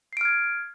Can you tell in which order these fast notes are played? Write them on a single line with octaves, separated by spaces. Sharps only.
C7 D7 F6 G#6